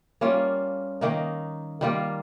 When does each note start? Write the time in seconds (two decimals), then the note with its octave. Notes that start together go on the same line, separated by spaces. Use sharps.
0.21 G3 A#3 C#4 F4
1.01 D#3 A#3 D#4
1.81 D#3 G3 A#3 F4